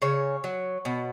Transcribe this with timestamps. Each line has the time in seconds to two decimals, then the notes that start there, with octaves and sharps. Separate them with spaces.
0.02 C#3 C#5
0.44 F#3
0.85 B2